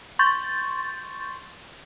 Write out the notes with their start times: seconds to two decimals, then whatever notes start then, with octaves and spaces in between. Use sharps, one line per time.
0.19 C6 C#6 G6 A6